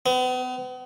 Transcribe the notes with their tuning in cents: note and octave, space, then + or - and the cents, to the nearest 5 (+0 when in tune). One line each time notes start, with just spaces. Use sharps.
B3 +40